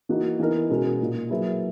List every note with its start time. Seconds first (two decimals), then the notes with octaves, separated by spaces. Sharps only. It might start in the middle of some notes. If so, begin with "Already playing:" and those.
0.09 E3 A#3 D#4 F#4
0.39 E3 B3 D#4 A#4
0.70 B2 G#3 C#4 F#4 A#4
1.00 A#2 A#3 D#4
1.30 F#3 A#3 E4 G#4 B4